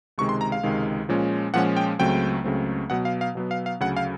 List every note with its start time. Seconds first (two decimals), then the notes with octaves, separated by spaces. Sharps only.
0.18 C#2 C3 D#3 G#3 C#6
0.29 C6
0.41 A#5
0.52 F5
0.63 C#2 C3 D#3 G#3
1.09 A#2 F3 G#3 C#4
1.54 A#2 F3 G#3 C#4 F#5
1.77 G5
1.99 C#2 C#3 F#3 A3 C4 G5
2.44 C#2 C#3 F#3 A3 C4
2.90 B2 F#3 B3 F#5
3.05 F5
3.21 F5
3.35 B2 F#3 B3
3.51 F5
3.66 F5
3.80 D2 C#3 F#3 F#5
3.97 F5